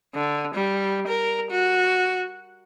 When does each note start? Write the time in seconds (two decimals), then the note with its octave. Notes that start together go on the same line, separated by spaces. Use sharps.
0.14 D3
0.55 G3
1.08 A#4
1.51 F#4